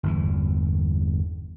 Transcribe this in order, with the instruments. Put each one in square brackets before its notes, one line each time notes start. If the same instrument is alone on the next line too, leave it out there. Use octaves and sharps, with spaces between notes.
[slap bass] G1 E2 E3